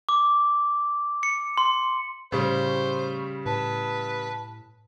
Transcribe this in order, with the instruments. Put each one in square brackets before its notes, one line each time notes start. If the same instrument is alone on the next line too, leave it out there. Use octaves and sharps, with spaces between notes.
[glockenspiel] D6
C#7
C6
[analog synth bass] A2 [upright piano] C#3 G3 [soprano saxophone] C5 [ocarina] C#6
[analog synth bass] A2 [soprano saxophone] B4 [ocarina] A5